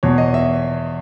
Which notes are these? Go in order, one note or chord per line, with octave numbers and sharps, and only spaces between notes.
E2 B2 C#5
D#5
E5